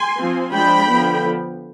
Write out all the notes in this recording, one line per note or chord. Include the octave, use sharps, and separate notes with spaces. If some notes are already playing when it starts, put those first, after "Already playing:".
Already playing: G#5 C6
F3 C4
F3 G#3 D4 G5 B5
D3 F3 B3